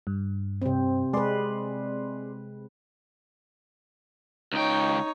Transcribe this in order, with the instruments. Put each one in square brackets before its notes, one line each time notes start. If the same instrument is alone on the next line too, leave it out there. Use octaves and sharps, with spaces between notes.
[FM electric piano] G2
[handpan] C3 C4
[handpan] G#3 B4 [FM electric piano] G#4 D5 C6
[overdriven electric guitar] C#2 G5 [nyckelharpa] D#4 C#5